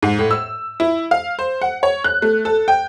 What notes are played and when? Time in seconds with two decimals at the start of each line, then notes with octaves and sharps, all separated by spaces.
0.03 G#2
0.19 A2
0.31 E6
0.80 E4
1.11 F5
1.39 C5
1.61 F#5
1.83 C#5
2.04 F#6
2.22 A3
2.45 A4
2.68 G5